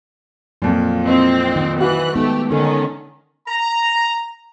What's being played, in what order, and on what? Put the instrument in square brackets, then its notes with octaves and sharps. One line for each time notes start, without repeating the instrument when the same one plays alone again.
[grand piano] F2 A#2 [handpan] F#3
[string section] C4 [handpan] E4 C5 D#5
[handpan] D#3 D#4 D#5
[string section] E3 F#6 [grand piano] F#4
[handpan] G#3 B3 D#4 [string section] A3 G4
[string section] D3 D#3 C#4 [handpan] D#4 A4
[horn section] A#5